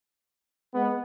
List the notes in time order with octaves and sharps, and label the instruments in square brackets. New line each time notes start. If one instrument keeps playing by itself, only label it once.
[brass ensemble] G#3 B3